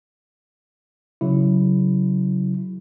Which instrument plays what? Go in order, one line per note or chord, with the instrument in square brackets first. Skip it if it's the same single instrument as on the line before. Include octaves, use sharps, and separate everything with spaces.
[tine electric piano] C#3 F#3 E4